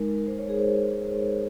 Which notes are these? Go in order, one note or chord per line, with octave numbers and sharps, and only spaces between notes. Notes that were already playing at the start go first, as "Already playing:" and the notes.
Already playing: G#3 D#4 A#4
A#4
C5
C#5
G#4
C5